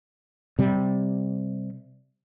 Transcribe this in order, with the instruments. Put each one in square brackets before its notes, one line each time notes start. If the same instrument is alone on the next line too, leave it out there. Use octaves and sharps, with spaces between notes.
[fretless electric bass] C3 G3